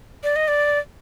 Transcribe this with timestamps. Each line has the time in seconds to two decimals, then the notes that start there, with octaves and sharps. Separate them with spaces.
0.24 D5
0.36 D#5
0.48 D5